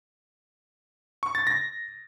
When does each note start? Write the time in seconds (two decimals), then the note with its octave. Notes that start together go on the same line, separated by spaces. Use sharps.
1.23 C#6
1.35 A6
1.47 A#6